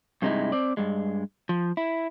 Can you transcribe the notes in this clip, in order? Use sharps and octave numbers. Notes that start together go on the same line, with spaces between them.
G2 C3 G#3 A3 D#4 E4
C4 D5
G2 G#3
F3
E4